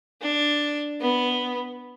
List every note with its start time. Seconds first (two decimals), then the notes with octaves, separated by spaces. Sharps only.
0.21 D4
1.01 B3